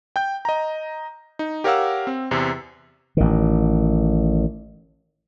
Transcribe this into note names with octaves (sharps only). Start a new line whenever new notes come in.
G5 G6
D#5 A#5
D#4
G4 A#4 C#5 F5 F#5 E6
C4
E2 C3
A1 D#3